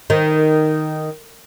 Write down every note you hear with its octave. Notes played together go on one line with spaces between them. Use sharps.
D#3